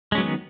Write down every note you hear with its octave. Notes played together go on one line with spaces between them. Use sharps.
D#3 F#3 G#3 B3 C#4